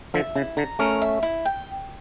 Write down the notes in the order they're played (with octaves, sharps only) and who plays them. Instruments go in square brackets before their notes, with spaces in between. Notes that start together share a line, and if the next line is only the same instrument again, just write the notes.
[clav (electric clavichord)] D3 F3 [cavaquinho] E5
[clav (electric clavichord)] C#3 [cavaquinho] E4
[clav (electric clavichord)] D3 [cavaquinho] A#5
[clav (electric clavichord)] A3 C#4 [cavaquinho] A#4
[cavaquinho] E5
E4
G5